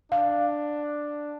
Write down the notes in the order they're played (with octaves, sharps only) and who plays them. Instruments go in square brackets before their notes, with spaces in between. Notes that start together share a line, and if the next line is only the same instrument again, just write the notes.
[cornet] D4 [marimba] F5